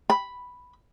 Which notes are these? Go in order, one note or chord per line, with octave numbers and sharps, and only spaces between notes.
B5